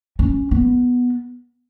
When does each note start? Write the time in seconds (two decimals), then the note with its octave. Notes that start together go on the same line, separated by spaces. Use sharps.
0.19 C#4
0.51 B3